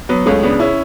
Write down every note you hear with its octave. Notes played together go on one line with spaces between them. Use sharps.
F#3 B3
C#2 A3 C#4
C#3 B3 D4
C#4 E4